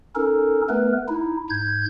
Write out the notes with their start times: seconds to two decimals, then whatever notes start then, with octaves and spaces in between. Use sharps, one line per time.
0.15 C#4 D#4 A4 A#4
0.69 A3 B3 A#4 B4
1.08 D#4 E4
1.50 G#2 G6 G#6